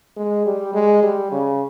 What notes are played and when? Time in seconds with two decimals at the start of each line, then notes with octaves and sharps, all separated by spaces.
0.17 G#3
0.46 G3
0.74 G#3
1.03 G3
1.32 C#3